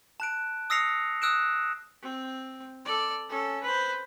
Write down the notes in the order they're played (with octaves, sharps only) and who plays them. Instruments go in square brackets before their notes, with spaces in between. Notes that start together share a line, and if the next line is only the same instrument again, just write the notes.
[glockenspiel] A5 F#6 D7
D#6 E6 A#6 C7 C#7 F7
D#6 E6 F#6 D7 E7
[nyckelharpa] C4
A4 D5
C#4 A4
B4 C5